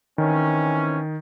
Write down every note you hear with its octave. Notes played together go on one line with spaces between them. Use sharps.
D#3 E3 C4 C#4